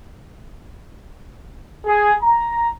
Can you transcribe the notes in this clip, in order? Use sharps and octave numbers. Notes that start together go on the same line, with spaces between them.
G#4
A#5